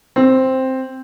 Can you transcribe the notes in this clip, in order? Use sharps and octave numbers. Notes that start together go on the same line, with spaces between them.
C4